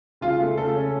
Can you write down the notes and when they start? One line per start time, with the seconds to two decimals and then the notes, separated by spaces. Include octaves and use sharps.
0.21 C#3 F4
0.40 A3
0.58 C#3 A4
0.75 C#4